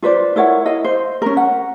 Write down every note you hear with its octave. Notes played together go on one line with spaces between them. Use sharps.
F4 B4 C5 D5
E4 A#4 C#5 F#5
E4 D#5 F5
C5
C#4 A#4
F#5